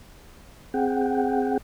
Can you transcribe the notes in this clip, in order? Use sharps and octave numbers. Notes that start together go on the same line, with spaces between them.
C4 G#4 F#5 G5